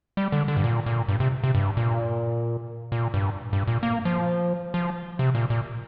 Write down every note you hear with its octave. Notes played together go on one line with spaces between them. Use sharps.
G3
D3
D3
G2
A#2
A#2
G2
C3
C3
G2
A#2
A#2
G2
G2
A#2
A#3
F3
F3
C3
A#2
A#2